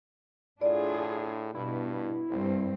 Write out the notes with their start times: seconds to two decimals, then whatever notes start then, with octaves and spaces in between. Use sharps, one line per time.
0.61 A2 D4 F4 G#4 D5
1.55 G2 B2 E4
2.30 C2 G2 C4